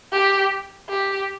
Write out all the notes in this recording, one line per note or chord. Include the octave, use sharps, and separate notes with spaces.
G4
G4